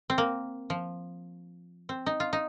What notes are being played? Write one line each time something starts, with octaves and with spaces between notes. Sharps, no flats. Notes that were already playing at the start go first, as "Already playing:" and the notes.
C4
A#3
F3
C4
D#4
F4
D#4